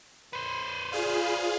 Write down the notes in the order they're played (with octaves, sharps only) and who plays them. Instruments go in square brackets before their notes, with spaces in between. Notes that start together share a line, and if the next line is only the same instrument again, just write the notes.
[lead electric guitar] B4 C5
[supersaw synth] F4 G#4 F5 [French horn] D5